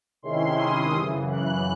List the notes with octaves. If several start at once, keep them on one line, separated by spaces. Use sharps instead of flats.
C3 D#3 G#3 C#4 E4 C6
D#6
F#2 C#3 E3
F#6